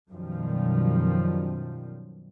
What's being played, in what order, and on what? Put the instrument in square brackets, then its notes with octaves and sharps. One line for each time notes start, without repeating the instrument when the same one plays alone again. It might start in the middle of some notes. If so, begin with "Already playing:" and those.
[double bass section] F#2 B2 D#3 F3 G3